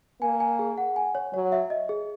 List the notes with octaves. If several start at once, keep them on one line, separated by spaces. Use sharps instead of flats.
A#3 G#5
G#5
G#4
F#5
G#5
C#5
F#3 C#5
E5
D#5
G#4